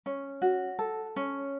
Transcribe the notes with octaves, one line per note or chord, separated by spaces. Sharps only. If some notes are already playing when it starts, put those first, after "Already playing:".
C#4
F#4
A4
C#4